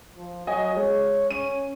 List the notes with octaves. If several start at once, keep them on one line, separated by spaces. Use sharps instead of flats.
F3
F#3 D#5 G#5
G#3 C#5
C#4 D#7